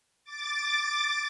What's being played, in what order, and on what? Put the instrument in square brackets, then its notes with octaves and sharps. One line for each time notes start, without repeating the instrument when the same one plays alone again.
[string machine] D6 A6